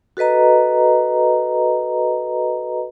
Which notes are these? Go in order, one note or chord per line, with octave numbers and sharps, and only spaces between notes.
F#4 A4 B4 D#5 A#5